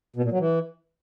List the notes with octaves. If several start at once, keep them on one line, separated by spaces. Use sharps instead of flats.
B2
A#2
F#3
E3